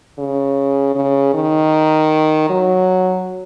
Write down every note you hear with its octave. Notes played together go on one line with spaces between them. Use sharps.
C#3
C#3
D#3
F#3